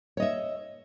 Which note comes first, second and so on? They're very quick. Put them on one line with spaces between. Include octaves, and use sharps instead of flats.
C#5 D#5 E5